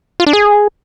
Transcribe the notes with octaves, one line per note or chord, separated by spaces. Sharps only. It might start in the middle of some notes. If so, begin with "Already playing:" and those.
F4
D4
G#4